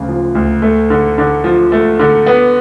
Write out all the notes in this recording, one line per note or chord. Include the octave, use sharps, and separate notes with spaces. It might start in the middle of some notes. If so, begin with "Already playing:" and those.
Already playing: D2 C#3
F3
D2
A3
D3
D3
F3
A3
D3
B3